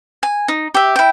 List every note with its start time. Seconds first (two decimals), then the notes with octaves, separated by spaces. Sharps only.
0.23 G#5
0.48 D#4
0.74 G4 E5
0.96 E4 G5